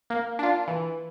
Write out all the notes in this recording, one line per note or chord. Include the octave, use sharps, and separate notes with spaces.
A#3
D4 F4
E3